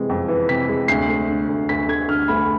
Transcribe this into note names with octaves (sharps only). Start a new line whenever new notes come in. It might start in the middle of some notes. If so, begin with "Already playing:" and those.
Already playing: C3 E3 G#3
F2
E3
C3 B6
G#3
D2 C7
A3
D3
D2
D2 B6
A3 G#6
D3 F6
D2 B5